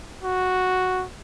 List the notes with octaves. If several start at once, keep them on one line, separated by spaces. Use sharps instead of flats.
F#4